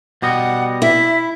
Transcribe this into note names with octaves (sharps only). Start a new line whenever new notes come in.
B2 G3 D#5 F#5
E4 E5